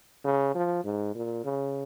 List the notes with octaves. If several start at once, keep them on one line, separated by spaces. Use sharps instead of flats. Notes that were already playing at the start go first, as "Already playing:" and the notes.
C#3
F3
G#2
A#2
C#3